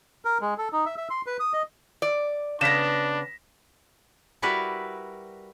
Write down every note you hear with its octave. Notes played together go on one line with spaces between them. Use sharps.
A#4
G#3
A4
D#4
E5
E5
C6
B4
D#6
D#5
D5
C#3 B3 D4 A#6 B6 E7
G3 E4 F#4 A#4 B4 D5